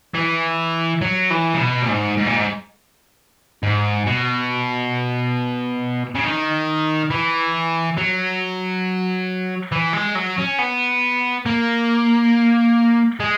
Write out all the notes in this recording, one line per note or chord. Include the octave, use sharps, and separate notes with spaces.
E3
F#3
E3
C#3
B2
A#2
G#2
G#2
A#2
G#2
G#2
B2
C#3
D#3
E3
F#3
E3
G#3
F#3
C#4
B3
A#3
G#3